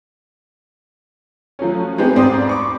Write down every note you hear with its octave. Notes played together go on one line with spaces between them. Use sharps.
F3 F#3 A3 C#4
G#3 B3 C4 D#4 G4 G#4
G#2 C4 D5 C6 D#6
B5 C#6 D6